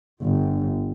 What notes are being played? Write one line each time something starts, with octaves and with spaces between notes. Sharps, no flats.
G1